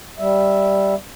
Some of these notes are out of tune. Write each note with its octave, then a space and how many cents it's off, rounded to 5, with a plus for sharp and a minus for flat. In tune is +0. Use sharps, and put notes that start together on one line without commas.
G3 +0 E5 +0